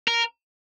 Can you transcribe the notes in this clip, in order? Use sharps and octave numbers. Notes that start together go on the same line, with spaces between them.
A#4